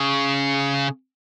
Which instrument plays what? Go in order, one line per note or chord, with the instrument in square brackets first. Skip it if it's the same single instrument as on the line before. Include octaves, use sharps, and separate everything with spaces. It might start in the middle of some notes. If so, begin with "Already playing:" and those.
Already playing: [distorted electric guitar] C#3